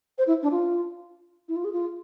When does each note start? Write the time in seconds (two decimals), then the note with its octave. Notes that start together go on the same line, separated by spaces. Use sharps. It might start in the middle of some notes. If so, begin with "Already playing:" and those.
0.18 C5
0.27 E4
0.43 D4
0.51 F4
1.49 E4
1.56 F4
1.65 G#4
1.73 F4